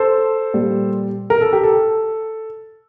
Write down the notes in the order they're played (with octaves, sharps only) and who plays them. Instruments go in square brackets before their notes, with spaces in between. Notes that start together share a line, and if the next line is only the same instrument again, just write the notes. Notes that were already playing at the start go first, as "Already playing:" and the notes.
Already playing: [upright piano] A4 C5
A#2 G3
A#4
A4
G4
A4